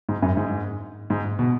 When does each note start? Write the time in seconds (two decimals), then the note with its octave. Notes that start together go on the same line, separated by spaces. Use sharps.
0.09 G#2
0.22 F#2
0.37 G#2
1.10 G#2
1.39 B2